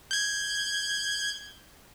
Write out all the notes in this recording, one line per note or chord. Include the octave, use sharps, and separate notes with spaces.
G6 G#6